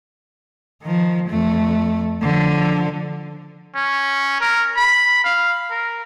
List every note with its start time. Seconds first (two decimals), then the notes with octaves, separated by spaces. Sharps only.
0.82 D#3 F3
1.29 F2 A3
2.22 D3 F3
3.75 C#4
4.41 A#4
4.76 B5
5.24 F5
5.71 A#4